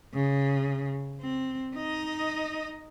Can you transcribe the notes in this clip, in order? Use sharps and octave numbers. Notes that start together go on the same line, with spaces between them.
C#3
C4
D#4 D#5